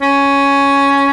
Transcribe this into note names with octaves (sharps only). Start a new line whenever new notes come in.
C#4